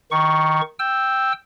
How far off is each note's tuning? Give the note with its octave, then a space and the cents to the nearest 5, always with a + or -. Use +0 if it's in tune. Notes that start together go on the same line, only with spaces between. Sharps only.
D#3 +0 C#6 +0
G5 +0 E6 +0